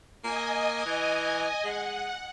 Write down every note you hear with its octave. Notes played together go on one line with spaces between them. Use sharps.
A#3 D#5 G#5
E3
G#3 F#5